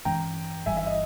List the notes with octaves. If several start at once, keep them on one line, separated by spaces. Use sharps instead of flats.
G2 E3 G#3 C#4 G5 A#5
G1 G2 E3 G3 E5 G#5
E5
D#5